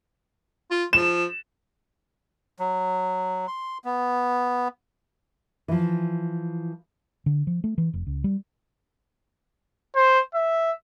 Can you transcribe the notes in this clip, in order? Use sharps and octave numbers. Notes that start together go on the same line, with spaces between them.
F4
F3 E7
F#3
C6
B3
E3 F3
D3
F3
A3
E3
F1
C#2
G3
C5
E5